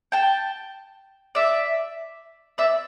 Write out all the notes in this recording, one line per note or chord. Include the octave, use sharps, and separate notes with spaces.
G5 A5
D5 E5
D5 E5